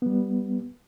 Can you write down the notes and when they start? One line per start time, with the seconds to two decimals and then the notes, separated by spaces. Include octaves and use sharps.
0.02 G3 B3